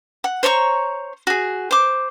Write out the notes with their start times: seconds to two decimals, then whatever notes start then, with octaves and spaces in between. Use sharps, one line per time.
0.24 F#5
0.43 C5 C#5 A#5 C#6
1.27 F#4 G#4
1.71 C5 D6